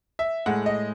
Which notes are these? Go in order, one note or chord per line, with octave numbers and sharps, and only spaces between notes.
E5
A2 G#3 F#5
D#5